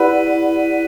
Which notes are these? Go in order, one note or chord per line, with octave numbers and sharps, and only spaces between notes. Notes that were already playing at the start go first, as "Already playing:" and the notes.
Already playing: E4 G4 B4 D5 F#5